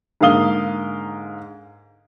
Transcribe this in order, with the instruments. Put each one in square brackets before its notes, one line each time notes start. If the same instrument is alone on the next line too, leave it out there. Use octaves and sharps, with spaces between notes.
[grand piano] G#2 D3 A#3 F5 D#6 G7